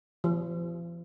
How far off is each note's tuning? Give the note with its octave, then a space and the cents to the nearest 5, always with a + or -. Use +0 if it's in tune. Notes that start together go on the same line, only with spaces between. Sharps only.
F3 -40